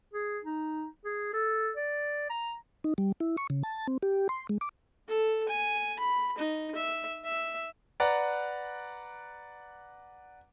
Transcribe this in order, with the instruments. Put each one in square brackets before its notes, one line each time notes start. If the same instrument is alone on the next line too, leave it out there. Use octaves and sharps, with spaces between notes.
[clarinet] G#4
D#4
G#4
A4
D5
A#5
[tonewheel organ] D#4
G3
E4
C#6
C#3
A5
C4
G4
C6
G#3
D6
[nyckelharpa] A4
G#5
B5
D#4
E5
E5
[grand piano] B4 D5 F#5 A#5